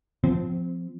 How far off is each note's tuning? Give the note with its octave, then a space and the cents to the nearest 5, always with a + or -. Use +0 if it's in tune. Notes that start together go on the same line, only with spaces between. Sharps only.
F3 +0 C4 -20